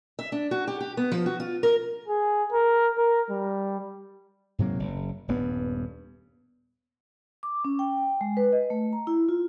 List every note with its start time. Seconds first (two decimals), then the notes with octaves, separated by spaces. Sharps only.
0.19 E5
0.32 D4
0.51 F#4
0.67 G4
0.80 G4
0.97 B3
1.11 F3
1.26 F#4
1.40 F4
1.63 A#4
2.08 G#4
2.52 A#4
2.98 A#4
3.30 G3
4.59 G#2 C3 F#3 A#3
4.79 F#1
5.28 D#1 G2 B3
7.43 D6
7.65 C#4
7.79 G5
8.21 G#3
8.37 B4
8.53 D#5
8.70 A3
8.93 A#5
9.07 E4
9.29 F4